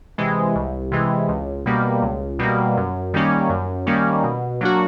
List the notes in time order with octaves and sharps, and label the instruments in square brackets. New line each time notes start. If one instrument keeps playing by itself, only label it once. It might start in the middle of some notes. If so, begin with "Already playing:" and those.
[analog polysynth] C3 E3 G#3
C2
C3 E3 G#3
C#2
B2 G3 A#3
C#2
B2 G3 A#3
F#2
D#3 G3 A#3 C#4
F#2
D#3 G3 A#3 C#4
B2
F#3 A#3 D4 F#4